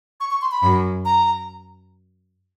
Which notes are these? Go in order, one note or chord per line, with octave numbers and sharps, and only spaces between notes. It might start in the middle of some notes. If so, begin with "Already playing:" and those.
C#6
C#6
C6
B5
F#2
A#5